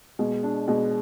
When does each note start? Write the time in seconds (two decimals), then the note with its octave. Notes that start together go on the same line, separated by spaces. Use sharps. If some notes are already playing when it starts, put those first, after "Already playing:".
0.19 B2 G#3
0.43 D4
0.68 B2 G#3